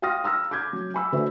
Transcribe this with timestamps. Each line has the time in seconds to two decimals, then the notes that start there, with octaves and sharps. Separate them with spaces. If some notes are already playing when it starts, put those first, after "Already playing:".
0.02 F5 G5 C6 D#6 F6 A#6
0.24 A#5 E6 F6 A#6
0.51 D6 F6 G6 G#6
0.73 F#3
0.94 G#5 B5 E6
1.12 D3 A3 F#4 B4 C5 E5